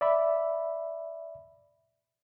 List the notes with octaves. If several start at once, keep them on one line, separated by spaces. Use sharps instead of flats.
D5 E5 B5